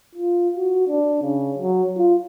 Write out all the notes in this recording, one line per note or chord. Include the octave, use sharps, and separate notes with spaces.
F4
F#4
D4
C#3
F#3
F4